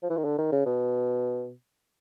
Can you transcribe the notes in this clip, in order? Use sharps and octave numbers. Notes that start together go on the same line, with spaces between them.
F3
E3
D#3
D3
D#3
C#3
B2